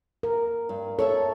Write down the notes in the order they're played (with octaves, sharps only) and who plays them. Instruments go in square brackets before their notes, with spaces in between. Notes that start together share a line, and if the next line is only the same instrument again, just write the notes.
[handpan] A#4
[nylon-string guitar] G2
[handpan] A4 [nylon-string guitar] C#5 D5 E5